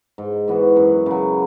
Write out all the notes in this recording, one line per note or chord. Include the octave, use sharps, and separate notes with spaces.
G#2
E3 B3 F#4
F#2
C#3 F#3